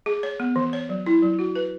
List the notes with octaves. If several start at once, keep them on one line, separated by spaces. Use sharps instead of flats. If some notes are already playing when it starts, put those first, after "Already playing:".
G#4
C#5
B3
E3
C#5
F#3
E4
F#3
F#4
B4